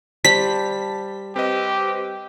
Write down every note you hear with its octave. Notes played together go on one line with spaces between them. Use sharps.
G3 C5 A5 B6
C4 G4 B4 D#5